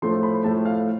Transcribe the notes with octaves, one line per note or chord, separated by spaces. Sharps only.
A2 F3 A3 C6
B5
A2 F3 A3 A5
F5